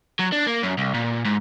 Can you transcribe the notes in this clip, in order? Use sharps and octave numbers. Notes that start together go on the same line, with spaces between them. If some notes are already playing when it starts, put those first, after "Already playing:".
F#3
D4
A#3
F#2
C2
A#2
G#2